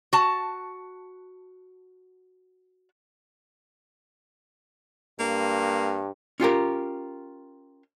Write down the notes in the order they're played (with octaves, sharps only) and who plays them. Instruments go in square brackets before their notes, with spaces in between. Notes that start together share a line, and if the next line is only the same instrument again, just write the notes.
[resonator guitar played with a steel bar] F#4 A5
[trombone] G2 [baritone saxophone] A#3
[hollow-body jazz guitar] C#4 F4 G4 A#4